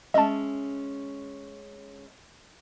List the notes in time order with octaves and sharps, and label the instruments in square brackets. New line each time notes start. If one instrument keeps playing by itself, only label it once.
[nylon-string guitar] G#3 C#4 E5 [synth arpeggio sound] D#5 A5